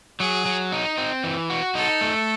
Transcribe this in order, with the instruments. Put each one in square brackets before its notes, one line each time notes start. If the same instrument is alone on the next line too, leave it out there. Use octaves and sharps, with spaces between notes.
[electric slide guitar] F#3 [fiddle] G#4
[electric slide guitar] F#3
D#4
C4
E3
F#4
[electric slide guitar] D#4 [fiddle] A4
[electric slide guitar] A3